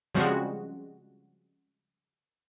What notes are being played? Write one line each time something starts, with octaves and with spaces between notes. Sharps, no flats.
C#3 F3 G3 G#3 C4 F#4